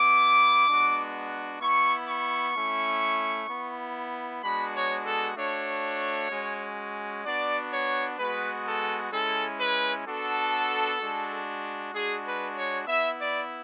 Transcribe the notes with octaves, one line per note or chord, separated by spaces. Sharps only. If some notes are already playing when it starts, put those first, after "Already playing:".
Already playing: B3 E4 D6
G#3 B3 D4 F#4
B3 E4 C#6
C#6
A3 C#4 E4
B3 E4
G#3 B3 D4 F#4 B5
C#5
A4
A3 D4 F#4 C#5
G#3 C#4 F#4
B3 D4 F#4 D5
C#5
G#3 B3 F#4 B4
A4
G#3 C#4 E4 A4
B4
B3 D4 F#4 A4
G#3 D4 F#4
G#3 D4 F#4 G#4
B4
C#5
B3 E4 E5
D5